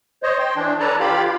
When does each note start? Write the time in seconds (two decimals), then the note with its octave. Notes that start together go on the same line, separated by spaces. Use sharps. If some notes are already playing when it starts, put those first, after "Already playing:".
0.23 C5 C#5 D#5
0.39 G5 C6
0.56 E3 D4
0.80 A4 B4 C#5 D5 A5 A#5
1.00 F4 G4 F5 G5 B5